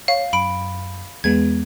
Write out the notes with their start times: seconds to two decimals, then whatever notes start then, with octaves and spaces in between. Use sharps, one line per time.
0.08 C#5 F5
0.33 F#2 B5 D7
1.24 E2 G#3 B3 G#6